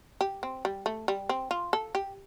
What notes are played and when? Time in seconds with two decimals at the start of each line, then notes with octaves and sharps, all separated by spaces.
0.21 G4
0.43 C4
0.65 G3
0.86 A3
1.08 G3
1.29 C4
1.51 F4
1.73 A4
1.95 G4